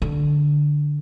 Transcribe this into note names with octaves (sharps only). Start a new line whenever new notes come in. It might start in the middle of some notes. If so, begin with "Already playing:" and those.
D3